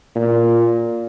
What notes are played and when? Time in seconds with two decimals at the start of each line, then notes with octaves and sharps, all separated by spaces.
0.16 A#2